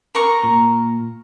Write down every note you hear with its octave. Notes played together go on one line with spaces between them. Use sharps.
A#4 A#5 C#6
A#2